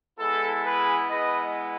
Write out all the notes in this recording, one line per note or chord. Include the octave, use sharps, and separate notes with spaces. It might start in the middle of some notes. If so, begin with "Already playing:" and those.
G#3 B3 E4 A4
G#4 B4
G#3 B3 E4 B4 D#5